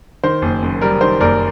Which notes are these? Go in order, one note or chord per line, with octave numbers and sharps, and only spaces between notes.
D#3 C5
F#1
F#2
G3 A#4
D#3 C5
F#1 A#4 D5